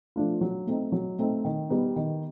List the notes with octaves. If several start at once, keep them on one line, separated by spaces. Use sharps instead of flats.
F3 A3 D4 F4
F#3
A3 C4 D#4
F#3
A3 C4 D#4
D#3
G3 B3 D#4
D#3